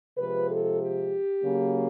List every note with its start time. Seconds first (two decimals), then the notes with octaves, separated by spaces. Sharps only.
0.17 C3 F3 G#3 B4
0.48 A4
0.79 G4
1.41 C#3 F#3 A#3